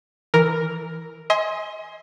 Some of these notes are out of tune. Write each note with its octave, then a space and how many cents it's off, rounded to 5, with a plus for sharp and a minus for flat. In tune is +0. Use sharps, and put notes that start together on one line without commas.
E3 +0 A#4 +0
D#5 +40 G#5 +0 C6 +0